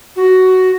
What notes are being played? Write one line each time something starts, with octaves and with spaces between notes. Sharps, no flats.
F#4